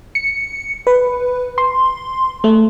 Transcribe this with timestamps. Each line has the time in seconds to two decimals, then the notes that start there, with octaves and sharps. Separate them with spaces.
0.15 C#7
0.87 B4
1.58 C6
2.44 A3